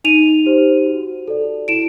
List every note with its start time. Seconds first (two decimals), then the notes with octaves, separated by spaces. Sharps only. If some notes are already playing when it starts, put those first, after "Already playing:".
0.04 D#4 D#7 F7
0.46 G4 C5
0.86 F#4
1.28 A4 D5
1.68 E4 D7 E7